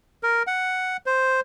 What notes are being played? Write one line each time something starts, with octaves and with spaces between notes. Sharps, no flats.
A#4
F#5
C5